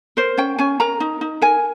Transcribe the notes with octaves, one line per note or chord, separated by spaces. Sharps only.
A#4 C5
C#4 G5
C#4 G#5
A#4 A#5
D#4
D#4
A#4 G#5